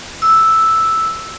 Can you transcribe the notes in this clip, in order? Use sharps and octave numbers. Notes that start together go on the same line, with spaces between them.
E6